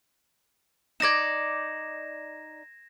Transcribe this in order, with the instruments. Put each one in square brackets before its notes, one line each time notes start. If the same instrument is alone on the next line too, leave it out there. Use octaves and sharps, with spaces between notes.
[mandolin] D#4 D5 [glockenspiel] G#6 A#6 E7